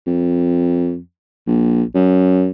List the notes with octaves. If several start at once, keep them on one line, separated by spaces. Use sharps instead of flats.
F2
A#1
F#2